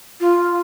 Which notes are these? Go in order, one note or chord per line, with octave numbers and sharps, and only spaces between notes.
F4